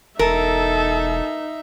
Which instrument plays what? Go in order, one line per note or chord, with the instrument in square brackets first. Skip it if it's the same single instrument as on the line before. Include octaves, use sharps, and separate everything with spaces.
[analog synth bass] E1 [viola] D#4 E5 [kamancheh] A4 [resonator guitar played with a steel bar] A#4